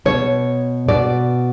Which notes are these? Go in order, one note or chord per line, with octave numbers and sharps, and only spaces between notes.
B2 C#5
B2 D5